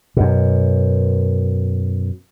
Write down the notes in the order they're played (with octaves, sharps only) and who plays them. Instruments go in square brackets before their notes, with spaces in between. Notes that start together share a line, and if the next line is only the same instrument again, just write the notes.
[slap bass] F#2 B2